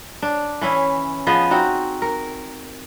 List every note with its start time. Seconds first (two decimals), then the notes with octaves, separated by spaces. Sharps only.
0.22 D4
0.61 E3 C#4 E4
1.27 F3 B3 G#4 D#5
1.51 C4 D#4 F#4
2.02 A#4